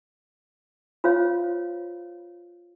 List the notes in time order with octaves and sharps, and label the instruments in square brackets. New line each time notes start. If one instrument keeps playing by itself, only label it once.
[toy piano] F4 C5 C#5 F5